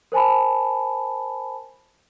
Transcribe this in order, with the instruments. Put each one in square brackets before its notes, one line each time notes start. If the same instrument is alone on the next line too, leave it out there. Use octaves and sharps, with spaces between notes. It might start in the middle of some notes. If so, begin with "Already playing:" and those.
[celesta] A#4 C5 G#5 A5 B5